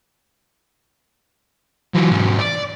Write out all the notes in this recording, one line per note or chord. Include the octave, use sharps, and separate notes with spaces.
E3 F#3
G#2 F#3
D5